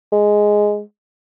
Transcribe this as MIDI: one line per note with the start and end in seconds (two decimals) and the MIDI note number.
0.12 0.80 56